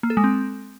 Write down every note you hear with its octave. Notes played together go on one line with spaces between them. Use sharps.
A#3
A4
G#3
C4